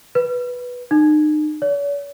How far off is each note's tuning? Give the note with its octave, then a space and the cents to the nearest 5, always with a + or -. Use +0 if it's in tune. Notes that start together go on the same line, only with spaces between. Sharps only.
B4 -5
D#4 -40
C#5 +45